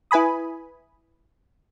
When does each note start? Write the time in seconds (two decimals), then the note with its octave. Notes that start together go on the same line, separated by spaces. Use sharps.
0.11 E4 B4 G#5 B5 D#6